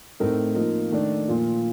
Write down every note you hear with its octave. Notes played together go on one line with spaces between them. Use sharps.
A2 A3 C4 D#4 A#4
F3 A#3 D#4 A#4
D#3 A3 D4 A4
A#2 F3 A#3 F4